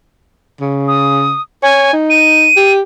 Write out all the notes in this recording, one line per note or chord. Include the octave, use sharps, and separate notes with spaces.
C#3
D#6
C#5 G#5
D#4
D#7
G4